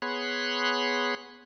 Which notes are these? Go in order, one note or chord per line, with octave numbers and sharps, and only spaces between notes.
B3 G#4 C#5 B5 C6 F#6